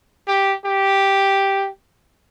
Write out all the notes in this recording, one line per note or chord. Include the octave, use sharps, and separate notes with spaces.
G4
G4